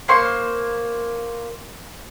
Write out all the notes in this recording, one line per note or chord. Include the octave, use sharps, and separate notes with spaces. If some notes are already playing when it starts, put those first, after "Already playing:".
A#3 C5 C6 C#6